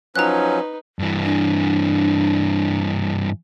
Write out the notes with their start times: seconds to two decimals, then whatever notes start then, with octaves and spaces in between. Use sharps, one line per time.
0.16 F3 F#3 C#4 D#4 B4 A#5 F#6
0.99 G2 E3
1.24 D4